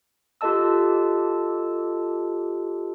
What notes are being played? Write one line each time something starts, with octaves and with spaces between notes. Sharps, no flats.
F4 G4 A4 D#5 A5 E6